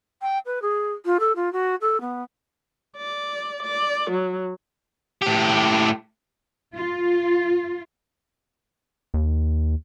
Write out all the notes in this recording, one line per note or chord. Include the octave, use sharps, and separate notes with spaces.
G5
B4
G#4
F4
A4
F4
F#4
A4
B3
D5
D5
F#3
A2 G4
F4
D#2